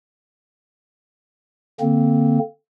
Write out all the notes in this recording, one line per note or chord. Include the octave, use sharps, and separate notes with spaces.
D3 A#3 C4